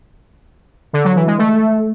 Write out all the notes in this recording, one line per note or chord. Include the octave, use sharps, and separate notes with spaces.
D3
F#3
E3
G#3
A3